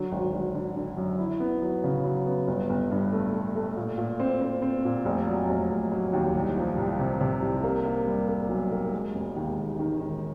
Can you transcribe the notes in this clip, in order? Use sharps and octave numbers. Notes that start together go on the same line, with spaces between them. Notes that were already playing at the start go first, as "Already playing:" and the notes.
Already playing: D3 F#3
G#1
G#1
D3
D3
F#2
E4
B3
F#3
C#3
F#3
B3
G1
G1
G2
A3
A3
A3
A#2
A#2
C4
C4
C4
A#2
F1
F#3
F1
F1
F#3
D#2
C2
F3
C2
C3
C3
C2
A#3
A#3
G3
A#3
B1
A#3
G#3
E1
D#2
D#2
D#3
D#3